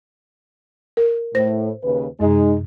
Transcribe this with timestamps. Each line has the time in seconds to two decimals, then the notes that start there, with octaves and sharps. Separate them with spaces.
0.97 A#4
1.35 A2 C5 A#6
1.84 D#2 C#3 B4
2.20 F#2 C3 G#3 D#4